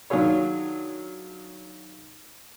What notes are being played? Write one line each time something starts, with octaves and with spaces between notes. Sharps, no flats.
D#3 F#3 D4 F4 G#4 C#5